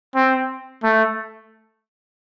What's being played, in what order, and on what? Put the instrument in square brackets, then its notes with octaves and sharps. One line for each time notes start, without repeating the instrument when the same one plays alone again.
[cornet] C4
A3